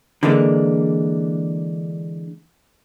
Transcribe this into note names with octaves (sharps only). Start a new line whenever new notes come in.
D3 E3 G#3 A#3 D4